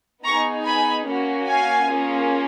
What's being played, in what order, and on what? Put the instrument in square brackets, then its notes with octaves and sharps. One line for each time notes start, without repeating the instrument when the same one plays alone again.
[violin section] B3 D#4 G#4 A#5 C#6
G#5 B5
A#3 C#4 F#4
F5 G#5
A#3 C#4 F4 G#4